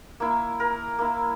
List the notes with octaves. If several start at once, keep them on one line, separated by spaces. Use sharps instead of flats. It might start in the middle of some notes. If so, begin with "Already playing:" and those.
A#3 E4
A#4
A#3 E4